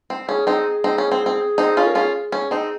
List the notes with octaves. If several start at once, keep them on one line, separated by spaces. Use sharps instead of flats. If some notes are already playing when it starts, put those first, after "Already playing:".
C4
C#4 G#4
C4 D#4
C4 D#4
C#4
C4
C4
C4 D#4
C#4 F4
A#4
C#4 F4 G#4
C#4
C4 D#4